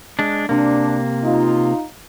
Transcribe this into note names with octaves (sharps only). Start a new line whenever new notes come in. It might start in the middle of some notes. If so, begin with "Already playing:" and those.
G#3 D4
C3 A#3 D4
D#4 F4